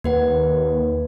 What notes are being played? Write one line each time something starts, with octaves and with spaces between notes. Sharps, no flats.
D#2 A#3 B4 F#5